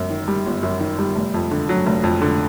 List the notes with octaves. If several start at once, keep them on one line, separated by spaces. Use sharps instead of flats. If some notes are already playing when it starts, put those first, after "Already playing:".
Already playing: G1 F#2
D#3
G3
G1
F#2
D#3
G3
F1
F2
D3
F#3
F1
F2
D3